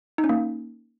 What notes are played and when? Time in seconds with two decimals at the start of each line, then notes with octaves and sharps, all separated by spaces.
0.18 D#4
0.24 C#4
0.29 A#3